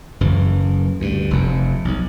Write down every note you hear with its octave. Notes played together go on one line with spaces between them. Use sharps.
F#1 F#2 E3
D2 G2
F1 F2
B1